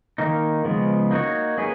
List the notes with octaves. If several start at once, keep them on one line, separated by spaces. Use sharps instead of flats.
D#3 A#3 D#4
C#3 F3 G#3 B3
A#3 D#4 F#4 C#5
A#3 C#4 G#4 B4